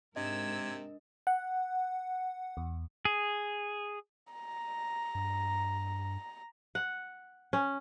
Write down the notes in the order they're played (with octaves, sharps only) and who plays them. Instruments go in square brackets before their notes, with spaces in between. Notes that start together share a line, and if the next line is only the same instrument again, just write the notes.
[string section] G#2 A#4 E6 [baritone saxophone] C3 [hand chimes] D4 D#5 [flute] G#6
[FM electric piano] F#5
E2
[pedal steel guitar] G#4
[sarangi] A#5
[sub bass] G2
[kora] F#5
C#4